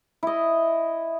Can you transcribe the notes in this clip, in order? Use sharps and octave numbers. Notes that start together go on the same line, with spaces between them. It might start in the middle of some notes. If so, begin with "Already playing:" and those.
E4 D#5